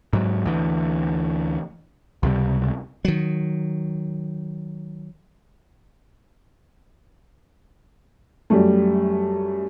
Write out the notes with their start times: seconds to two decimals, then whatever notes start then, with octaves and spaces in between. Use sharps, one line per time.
0.13 G#2 F#3
0.45 D2 E3
2.23 C#2 C3 G3
3.05 D#3 F#3
8.50 F#2 G3 A3